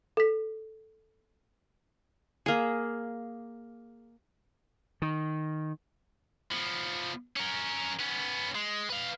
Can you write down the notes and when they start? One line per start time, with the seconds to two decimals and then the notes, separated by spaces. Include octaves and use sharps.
0.17 A4 B6
2.46 A#3 G#4
5.02 D#3
6.51 F3 B3
7.36 C#4 A#4
7.99 B3 C#4
8.55 G#3
8.90 B4 F5